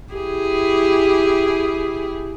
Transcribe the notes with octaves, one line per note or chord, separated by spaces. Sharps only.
E4 G4 G#4